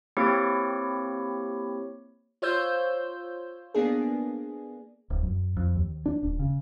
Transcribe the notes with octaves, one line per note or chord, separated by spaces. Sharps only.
A#3 C4 E4 G4 C#5
F4 C5 C#5 E6 G6
A#3 B3 D4 G#4
D1
F#2
F2
D#2
D4
D#1
C#3